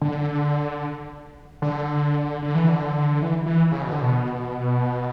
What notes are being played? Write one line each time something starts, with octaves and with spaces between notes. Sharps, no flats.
D3
D3
D3
E3
D3
E3
E3
C#3
B2
D3
B2